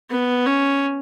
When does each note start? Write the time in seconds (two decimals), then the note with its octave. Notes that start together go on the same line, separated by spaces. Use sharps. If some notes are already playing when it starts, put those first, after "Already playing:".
0.10 B3
0.46 C#4